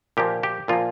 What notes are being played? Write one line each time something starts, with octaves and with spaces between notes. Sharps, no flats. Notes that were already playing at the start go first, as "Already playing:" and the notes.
A#2 F3 A#3 G4
G4
A#2 F3 A#3 F4